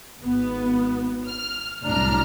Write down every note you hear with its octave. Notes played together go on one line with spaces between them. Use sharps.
G#1 B3
F6
C2 F#2 A2 D4 A#5 F6